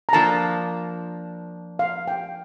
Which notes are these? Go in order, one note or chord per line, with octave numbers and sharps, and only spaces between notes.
A#5
F3 A#3 D4 A5
F5
G5